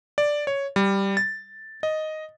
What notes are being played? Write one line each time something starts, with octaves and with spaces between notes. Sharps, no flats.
D5
C#5
G3
A6
D#5